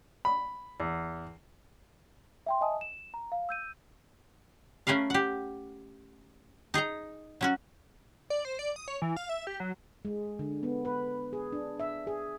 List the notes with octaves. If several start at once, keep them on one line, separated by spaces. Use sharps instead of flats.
B5
E2
E5 G5 C6
D#5 E5 G#5 A5 D#6
E7
A#5
F5
E6 G6 D#7
A3 C#4 A#4 B4 F5
G4 F#5
D#4 G#4 D#5 A#5
F#3 C#4 F#4
D5
C5
D5
D#6
C#5
E3
F5
E5
G4
F#3
G#3
D3
B3
B4
G#4
D4
E5
G#4